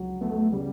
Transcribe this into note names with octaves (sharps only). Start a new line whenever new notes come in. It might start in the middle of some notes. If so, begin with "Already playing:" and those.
Already playing: C#2 F#3
A3 B3
C#3 G3